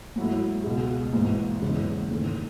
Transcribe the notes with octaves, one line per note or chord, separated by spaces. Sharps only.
G#2 F#3 A3 E4
C#2 B2 G#3
G#1 G#2 E3
F#1 E2 C#3 E3 G#3
G#1 G#2 D#3 A3 C#4